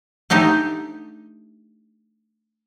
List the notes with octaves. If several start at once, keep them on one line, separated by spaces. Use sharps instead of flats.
A3 D4 D#4 G4